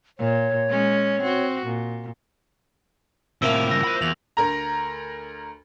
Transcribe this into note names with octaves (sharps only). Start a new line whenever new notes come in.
A#2 C#5
G#3 C#4
C4 F#4
A#2
A2 C3 F3 A#3 E4 E6 F7
G2 C#3 E6 A#6
C5 B5
E2 F7 F#7
D2 A#4 A#5